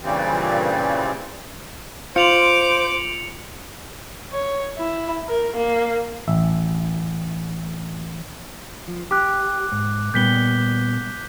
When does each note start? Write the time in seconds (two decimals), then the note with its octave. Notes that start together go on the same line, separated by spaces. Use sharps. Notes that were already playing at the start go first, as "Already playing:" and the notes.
0.01 G2 A#2 C#3 E3 G3 C4
2.16 F4 C5 D6 C#7 F7 F#7
4.32 C#5
4.78 E4
5.28 A#4
5.56 A#3
6.28 A1 E5
8.88 F3
9.11 G4 D6 F#6
9.72 G#2
10.14 A#2 G3 B3 G6 B6 G7